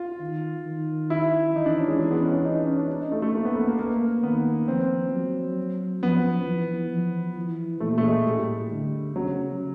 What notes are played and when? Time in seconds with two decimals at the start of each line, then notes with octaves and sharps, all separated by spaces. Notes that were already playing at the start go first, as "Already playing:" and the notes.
Already playing: F4
0.20 D#3
0.66 D#3
1.10 E4
1.55 E3 D#4
1.66 D4
1.78 C#4
1.88 G#3
2.00 G#3
2.11 B3
2.22 C#4
2.33 D4
2.45 D#4
2.67 C#4
2.79 D4
3.01 D#4
3.12 A3
3.22 A3
3.34 A#3
3.45 B3
3.56 A3
3.68 A#3
3.79 A#3
4.23 D#3 B3
4.67 F3 C4
5.13 F#3
6.02 F3 B3
6.46 E3
6.91 F3
7.37 E3
7.80 A#2 A3
7.98 A3
8.03 G#3
8.25 A2 G3
8.71 D3
9.16 C#3 F#3